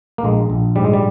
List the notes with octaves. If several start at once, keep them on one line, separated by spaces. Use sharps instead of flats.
A#3
A#1 G#3
A#1
G#2 G3
G#3
G3